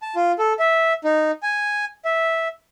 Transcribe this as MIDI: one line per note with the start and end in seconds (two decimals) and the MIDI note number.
0.02 0.15 81
0.15 0.32 65
0.39 0.53 69
0.59 0.93 76
1.04 1.31 63
1.43 1.85 80
2.05 2.48 76